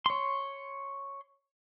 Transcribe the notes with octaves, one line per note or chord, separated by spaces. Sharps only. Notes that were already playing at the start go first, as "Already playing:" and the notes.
C#5 C6